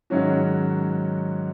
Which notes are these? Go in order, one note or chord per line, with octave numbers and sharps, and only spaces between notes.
G#2 D#3 F#3 C#4 F#4